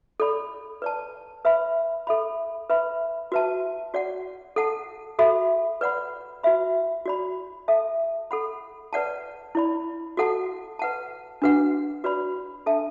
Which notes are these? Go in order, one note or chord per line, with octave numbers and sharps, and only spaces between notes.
A4 D5 B5
B4 D5 A5
B4 E5 B5
A4 E5 B5
B4 E5 B5
F#4 B4 E5 A5
F#4 D5 F#5
A4 F#5 A5
F#4 A4 E5 B5
B4 D5 F#5 B5
F#4 B4 E5 B5
F#4 D5 B5
A4 E5 A5
A4 F#5 B5
B4 D5 F#5 A5
E4 D5 B5
F#4 A4 F#5 A5
B4 F#5 A5
D4 F#4 B4 F#5
F#4 B4 D5 B5
D4 A4 E5 A5